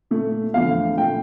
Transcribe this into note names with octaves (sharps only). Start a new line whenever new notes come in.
A#2 A3
E2 D3 F3 A3 F5
A#2 A3 G5